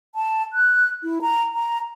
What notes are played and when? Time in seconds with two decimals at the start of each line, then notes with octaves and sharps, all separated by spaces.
0.15 A5
0.53 F#6
1.03 E4
1.21 A#5
1.53 A#5